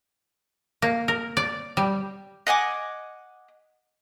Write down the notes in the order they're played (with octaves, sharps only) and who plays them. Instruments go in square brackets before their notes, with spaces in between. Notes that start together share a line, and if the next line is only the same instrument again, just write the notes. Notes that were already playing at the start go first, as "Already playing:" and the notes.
[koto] A#3
A#4
D5
G3
[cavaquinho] D#5 F#5 G#5 D6